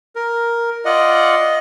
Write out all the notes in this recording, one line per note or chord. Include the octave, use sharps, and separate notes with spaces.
A#4
F4 D5 D#5 F#5